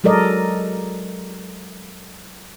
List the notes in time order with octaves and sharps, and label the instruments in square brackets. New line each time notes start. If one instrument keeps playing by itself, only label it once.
[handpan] F#3 G#3 A4 A#4 D5 D#5